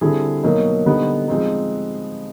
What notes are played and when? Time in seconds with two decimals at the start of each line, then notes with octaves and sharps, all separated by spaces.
0.01 D3 G3 C4 E4 G#4
0.43 B2 F#3 A#3 D#4
0.86 D3 G3 B3 D#4
1.28 F3 G#3 C4 D#4